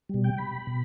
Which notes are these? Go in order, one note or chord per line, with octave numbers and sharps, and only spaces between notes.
B2 G3
G5
B5
B2